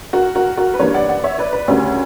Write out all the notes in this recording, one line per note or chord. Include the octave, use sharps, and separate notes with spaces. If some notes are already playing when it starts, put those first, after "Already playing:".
F#4 A#4
F#4 A#4
F#4 A#4
B4
G2 E3 G3 A#3 A#4 C#5
D5 F#5
D5 F#5
C#5 E5
B4 D5
B4 D5
D2 C#3 G3 A#4 C#5